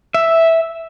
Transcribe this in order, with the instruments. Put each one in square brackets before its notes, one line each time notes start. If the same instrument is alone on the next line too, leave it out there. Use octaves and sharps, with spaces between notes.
[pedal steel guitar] E5